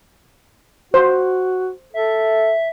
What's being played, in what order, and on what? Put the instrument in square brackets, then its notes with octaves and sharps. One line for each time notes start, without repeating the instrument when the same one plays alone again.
[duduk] F#4 [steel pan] C5
[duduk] A4 [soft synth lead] E5